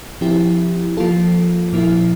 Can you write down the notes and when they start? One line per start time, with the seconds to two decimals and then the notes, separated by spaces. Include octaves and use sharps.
0.21 F3 C4 E4 G4
0.97 F3 A#3 F4 A4
1.73 A#2 F3 A#3 E4